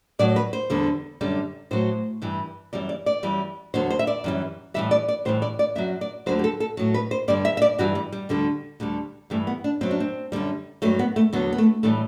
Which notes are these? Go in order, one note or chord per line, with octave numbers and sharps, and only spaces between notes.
A2 F#3 D5
B4
C5
E2 D3 G3
F#2 D3 G3
A2 F#3 C5
G2 E3 G3
F#2 E3 G3 D5
D5
D5
F#2 E3 G3
E2 D3 F#3 C5
C5
E5
D5
F#2 E3 G3
A2 E3 G3 E5
D5
D5
A2 E3 G3 C5
D5
D5
F#2 F#3 E5
D5
D2 D3 F#3 C5
G4
A4
A4
A2 F#3
B4
C5
G2 D3 G3 D5
E5
E5
D5
G2 E3 G3 F#4
G3
G3
D2 D3 G3
D2 D3 G3
G2 E3 G3 A3
B3
D4
F#2 F#3 C4
D4
C4
F#2 D3 G3
G2 F#3 A3
B3
A3
E2 D3 F#3 B3
B3
A3
A2 E3 G3 A3